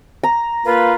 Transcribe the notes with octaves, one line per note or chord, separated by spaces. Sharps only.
A#5
A#3 F4 B4